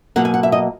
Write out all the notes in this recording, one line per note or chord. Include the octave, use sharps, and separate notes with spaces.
B2 F#3 A#3 F#5
G#5
F#5
E5
D#5